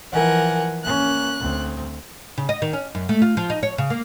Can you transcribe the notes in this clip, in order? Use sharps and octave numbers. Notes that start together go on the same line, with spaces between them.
E3 F3 A#4 F#5 G#5
A#3 C#4 F#6
D2 C4
C#3
D#5
D#3
C#4
F#2
A3
F4
F3
D#4
C#5
C#3
A#3